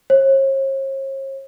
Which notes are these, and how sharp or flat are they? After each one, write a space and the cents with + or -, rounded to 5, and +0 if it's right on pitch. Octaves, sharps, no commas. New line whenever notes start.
C#5 -45